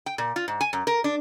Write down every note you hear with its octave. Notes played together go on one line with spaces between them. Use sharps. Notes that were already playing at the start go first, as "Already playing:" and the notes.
G5
A#2
F4
G#2
G#5
F#2
A#4
D4